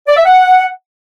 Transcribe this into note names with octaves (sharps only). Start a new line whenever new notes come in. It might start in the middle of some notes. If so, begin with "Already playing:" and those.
D5
E5
F#5